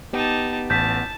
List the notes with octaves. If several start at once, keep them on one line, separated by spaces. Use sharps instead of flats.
B3 D#4 G4 A5
A1 A5 G6 B6